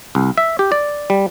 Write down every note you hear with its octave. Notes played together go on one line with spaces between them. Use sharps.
C2
E5
G4
D5
G3